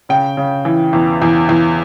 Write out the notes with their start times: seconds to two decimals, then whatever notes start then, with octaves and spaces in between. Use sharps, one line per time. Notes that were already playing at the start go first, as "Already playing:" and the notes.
0.09 C#3 G5
0.37 C#3
0.65 E3
0.93 E2
1.22 E2
1.49 E2